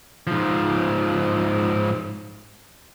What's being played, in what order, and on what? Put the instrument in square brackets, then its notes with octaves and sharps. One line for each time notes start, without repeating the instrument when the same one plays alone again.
[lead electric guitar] G#2 F3